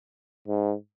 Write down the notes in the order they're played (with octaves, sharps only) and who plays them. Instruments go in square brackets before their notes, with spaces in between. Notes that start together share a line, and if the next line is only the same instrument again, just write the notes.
[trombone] G#2